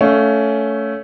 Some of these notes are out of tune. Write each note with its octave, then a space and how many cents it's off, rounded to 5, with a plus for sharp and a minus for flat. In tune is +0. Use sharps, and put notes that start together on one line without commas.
A3 +0 C#4 +15 F5 +15